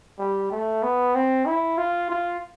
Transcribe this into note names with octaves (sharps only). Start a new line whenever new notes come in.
G3
A3
B3
C4
E4
F4
F4